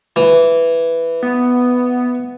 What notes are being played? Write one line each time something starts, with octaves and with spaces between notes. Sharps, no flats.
E3
B3